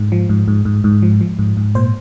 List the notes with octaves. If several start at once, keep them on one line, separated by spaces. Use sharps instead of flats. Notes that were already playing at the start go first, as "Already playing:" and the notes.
Already playing: G#2
F3
G#2
G#2
G#2
G#2
F3
F3
G#2
G#2
A#2 C5